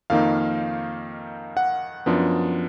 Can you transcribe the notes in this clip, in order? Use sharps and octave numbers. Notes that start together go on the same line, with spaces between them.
F2 D#3 A#3 D#4 F5
F#5
F#2 F3 B3 D4